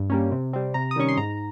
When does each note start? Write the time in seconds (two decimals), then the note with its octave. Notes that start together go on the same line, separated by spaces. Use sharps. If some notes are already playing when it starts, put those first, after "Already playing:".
Already playing: G2
0.10 G3 A#3 C#4
0.31 C3
0.53 G3 C4
0.74 C3 A#5
0.91 D#6
0.96 D#3 G3 C#4 C#6
1.08 C6
1.17 G#2 A#5